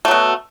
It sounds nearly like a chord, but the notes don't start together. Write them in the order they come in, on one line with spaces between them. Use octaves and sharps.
A3 F#3 B2